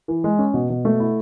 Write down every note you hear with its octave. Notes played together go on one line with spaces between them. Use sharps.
E3
G#3
C#4
B2
B2
A3
E4